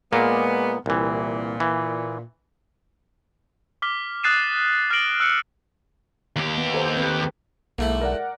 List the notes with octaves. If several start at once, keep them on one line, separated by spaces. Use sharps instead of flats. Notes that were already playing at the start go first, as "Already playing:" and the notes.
A#2 G#3 A#3 B3
C2 A#2 E3
E3
D6 F6 B6 G7
D#6 F#6 A6 C7 D#7 E7
F6 A6 A#6 D7 F#7 G7
E6 F#6 C#7
D#2 G4
B3
A4 C5
C4 B4
B1 G#2 A3 A#3 E4
A#4 D5 F#5